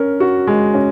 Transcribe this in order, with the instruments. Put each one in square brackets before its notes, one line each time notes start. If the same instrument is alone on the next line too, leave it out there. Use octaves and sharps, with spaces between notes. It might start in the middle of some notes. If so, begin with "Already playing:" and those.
Already playing: [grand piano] C#4 A#4
F#4
G#3
C#4